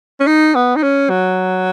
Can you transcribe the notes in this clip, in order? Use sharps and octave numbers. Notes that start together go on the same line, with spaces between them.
C#4
D#4
B3
D#4
C#4
F#3